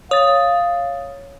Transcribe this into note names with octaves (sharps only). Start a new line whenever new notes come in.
C#5 F5 D#6 A6